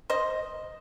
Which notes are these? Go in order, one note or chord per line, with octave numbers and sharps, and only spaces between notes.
C5 D#5